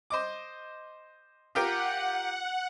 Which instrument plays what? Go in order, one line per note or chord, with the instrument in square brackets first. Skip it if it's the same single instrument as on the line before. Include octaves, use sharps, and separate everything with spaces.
[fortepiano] C5 D#5 D6
[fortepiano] F4 G4 A#4 [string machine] F#5